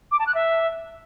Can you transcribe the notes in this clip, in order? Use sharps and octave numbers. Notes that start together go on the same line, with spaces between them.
D6
A5
F#6
E5